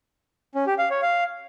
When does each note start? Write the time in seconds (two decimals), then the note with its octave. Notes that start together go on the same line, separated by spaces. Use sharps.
0.55 C#4
0.67 G4
0.79 F5
0.90 C#5
1.02 F5